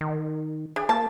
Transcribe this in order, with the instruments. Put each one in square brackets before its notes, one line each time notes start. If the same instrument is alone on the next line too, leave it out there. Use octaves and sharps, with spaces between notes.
[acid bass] D#3
[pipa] D4 [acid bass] G#4
[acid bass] A#3 [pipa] A5